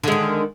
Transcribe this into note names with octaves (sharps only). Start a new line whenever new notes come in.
D3 D#3 G#3